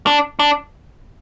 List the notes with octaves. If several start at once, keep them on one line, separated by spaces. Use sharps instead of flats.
D4
D4